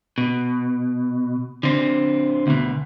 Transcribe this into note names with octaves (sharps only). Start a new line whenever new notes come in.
B2
D3 C4
D2 B2